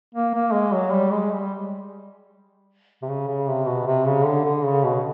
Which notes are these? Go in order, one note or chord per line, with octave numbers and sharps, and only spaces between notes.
A#3
A#3
G#3
F#3
G3
G#3
G3
C3
C#3
C#3
C3
B2
C3
C#3
D3
D3
C#3
B2